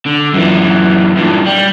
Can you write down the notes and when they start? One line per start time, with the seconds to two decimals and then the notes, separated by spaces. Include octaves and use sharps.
0.06 D3
0.34 F#2 E3
1.17 G2 A#2
1.46 G3